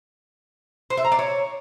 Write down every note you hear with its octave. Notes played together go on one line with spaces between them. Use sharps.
C5
E5
A#5
D5
C#5